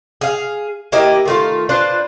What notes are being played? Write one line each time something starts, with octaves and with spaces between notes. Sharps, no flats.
G#4 F5
A#3 E4 G4 D#5
D#3 A3 F4
D4 F4 B4 C5